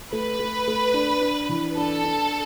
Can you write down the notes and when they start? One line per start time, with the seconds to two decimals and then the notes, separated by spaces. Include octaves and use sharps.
0.12 A3 B4
0.39 A3
0.68 A3
0.94 D4
1.21 D4
1.49 E3
1.76 D4 A4
2.04 D4